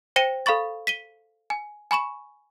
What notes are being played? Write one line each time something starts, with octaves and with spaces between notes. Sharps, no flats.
C5 G5 A#6 C#7 D#7 E7
A4 F5 B5 C#6 A6
B6 D#7 G7
G#5
G#5 B5 C#6 E7